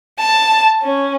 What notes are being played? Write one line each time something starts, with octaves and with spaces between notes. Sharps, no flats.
A5
C#4